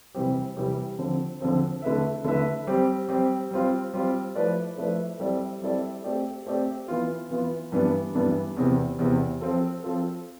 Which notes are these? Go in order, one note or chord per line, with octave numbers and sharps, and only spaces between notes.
C3 E3 G3 C4 G4
C3 E3 G3 C4 G4
D3 F3 C4
D3 F3 C4
D3 A3 E4 B4 E5
D3 A3 E4 B4 E5
G3 C4 G4
G3 C4 G4
G3 C4 F4
G3 C4 F4
F3 A3 E4 B4 D5
F3 A3 E4 B4 D5
G3 C4 E4 A4 D5
G3 C4 E4 A4 D5
A3 C4 G4 D5
A3 C4 G4 D5
E3 B3 F4
E3 B3 F4
G2 E3 B3 D4
G2 E3 B3 D4
E2 C3 E3
E2 C3 E3
F3 C4 F4 A4
F3 C4 F4 A4